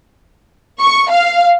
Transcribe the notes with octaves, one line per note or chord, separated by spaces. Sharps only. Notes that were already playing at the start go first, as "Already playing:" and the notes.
C#6
F5